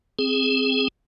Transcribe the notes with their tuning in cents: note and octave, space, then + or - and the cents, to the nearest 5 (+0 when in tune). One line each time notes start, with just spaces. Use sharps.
C4 +0 G#4 +0